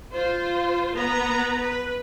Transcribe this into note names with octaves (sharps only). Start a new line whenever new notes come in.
F4 C5
B3 B4 A#5
B4